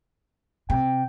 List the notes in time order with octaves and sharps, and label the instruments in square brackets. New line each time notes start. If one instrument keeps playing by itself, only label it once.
[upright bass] C3 [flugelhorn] G5